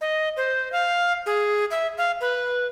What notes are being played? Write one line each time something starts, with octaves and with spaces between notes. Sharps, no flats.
D#5
C5
F5
G#4
E5
F5
B4